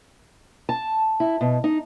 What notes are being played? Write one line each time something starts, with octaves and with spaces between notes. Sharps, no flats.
A5
E4
B2
D#4